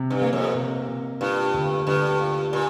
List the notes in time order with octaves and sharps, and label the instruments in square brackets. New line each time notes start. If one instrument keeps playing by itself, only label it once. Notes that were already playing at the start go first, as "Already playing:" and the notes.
Already playing: [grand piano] C3
[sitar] G2
[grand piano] A#3
[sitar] F2
[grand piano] C3
C3
[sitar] G2 [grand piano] F4
[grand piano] D2
[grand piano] D2 [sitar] G2
[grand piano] F4
[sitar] A#2